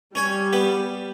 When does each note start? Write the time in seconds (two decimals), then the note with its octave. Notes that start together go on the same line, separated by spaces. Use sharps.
0.15 G3 C#4 C#5 G#5
0.53 B3 G4